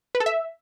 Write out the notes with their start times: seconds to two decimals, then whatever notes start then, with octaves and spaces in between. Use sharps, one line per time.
0.15 B4
0.20 A4
0.26 E5